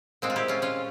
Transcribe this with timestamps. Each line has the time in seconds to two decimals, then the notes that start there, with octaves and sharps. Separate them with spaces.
0.22 A#2 G#3 C4
0.30 F4
0.36 E4 G4
0.48 C#4 F4
0.62 C#4 F4